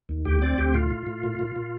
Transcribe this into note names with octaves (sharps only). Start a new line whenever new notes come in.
D#2
D2 G4
C4 D5
D2 G4
A2 F4
A2
A2
A#2
A#2
A#2